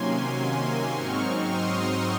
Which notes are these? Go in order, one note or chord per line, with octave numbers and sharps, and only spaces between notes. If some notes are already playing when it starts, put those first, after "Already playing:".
Already playing: C3 D#3 F#3 A#3 C#4 G#5 C6
G#2 F#3 C4 D#4 C#6 F6
C6 D#6